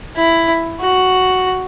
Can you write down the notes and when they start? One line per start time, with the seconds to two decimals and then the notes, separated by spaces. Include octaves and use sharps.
0.16 E4
0.81 F#4